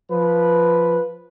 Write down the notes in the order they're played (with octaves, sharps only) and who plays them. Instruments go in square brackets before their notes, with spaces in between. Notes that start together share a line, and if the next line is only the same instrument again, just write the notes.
[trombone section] F3 B4